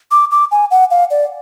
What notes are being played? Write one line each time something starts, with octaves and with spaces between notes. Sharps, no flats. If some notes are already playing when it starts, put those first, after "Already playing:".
D6
D6
G#5
F#5
F5
D5